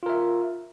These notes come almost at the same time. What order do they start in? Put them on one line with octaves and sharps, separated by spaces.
F4 A#4 E5